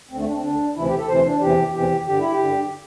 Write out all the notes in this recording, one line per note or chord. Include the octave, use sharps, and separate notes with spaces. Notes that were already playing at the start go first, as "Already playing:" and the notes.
D2 D3 C4
A3
D4
C4
D2 D3 D4
D2 C3 E3 E4
G4
A4
D2 C3 E3 C5
D4
E2 C3 E3 G4
E2 C3 E3 G4
G2 D3 G4
E4
G4
G2 D3